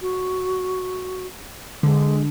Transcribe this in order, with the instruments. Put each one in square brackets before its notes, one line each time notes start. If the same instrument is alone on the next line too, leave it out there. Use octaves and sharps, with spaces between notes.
[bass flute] F#4
[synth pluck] D3 [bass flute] G#3